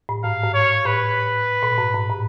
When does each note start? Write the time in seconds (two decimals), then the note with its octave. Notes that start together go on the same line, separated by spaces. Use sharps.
0.09 A2
0.24 G#2 F5
0.43 G#2
0.54 C#5
0.85 A2 B4
1.63 A#2
1.78 G#2
1.94 G#2
2.10 A2